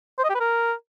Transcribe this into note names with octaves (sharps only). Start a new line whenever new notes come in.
C5
D#5
G4
B4
A#4